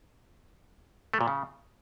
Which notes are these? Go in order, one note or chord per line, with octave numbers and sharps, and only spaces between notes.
A3
A#2
C#3